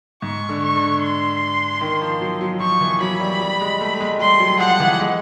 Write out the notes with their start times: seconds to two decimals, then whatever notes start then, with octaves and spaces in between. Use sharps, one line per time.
0.22 G#2 C#6
0.49 D3
0.62 C#6
0.76 D3
1.02 C6
1.81 D#3
2.01 F3
2.21 F#3
2.41 F#3
2.60 F3 C#6
2.81 E3
3.00 F#3 B5
3.20 G3
3.41 G3
3.61 G#3
3.81 A3
4.01 G#3
4.20 G3 C6
4.40 F#3
4.60 F3 F#5
4.80 E3
5.00 G#3